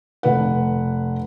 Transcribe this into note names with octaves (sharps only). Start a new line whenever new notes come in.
F1 B4 F#5